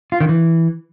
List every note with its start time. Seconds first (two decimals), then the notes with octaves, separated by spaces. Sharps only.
0.12 F4
0.20 D#3
0.29 E3